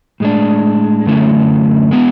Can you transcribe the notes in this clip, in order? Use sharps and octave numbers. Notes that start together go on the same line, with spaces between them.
A2 G#3 D4
F#2 D3 A3 C#4 E4
G#3 B3 E4